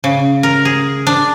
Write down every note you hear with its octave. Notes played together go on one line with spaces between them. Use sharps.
C#3
A#4
G#4
D4